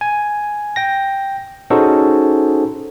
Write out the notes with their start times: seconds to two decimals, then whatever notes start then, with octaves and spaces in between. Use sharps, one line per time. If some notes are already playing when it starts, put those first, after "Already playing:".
0.01 G#5
0.76 G5 A#6
1.70 C#4 D#4 F#4 G#4 A4 C5